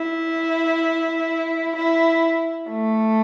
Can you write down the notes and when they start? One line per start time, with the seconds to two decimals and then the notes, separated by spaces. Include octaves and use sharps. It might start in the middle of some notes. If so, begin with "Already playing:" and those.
Already playing: E4
1.76 E4
2.70 A3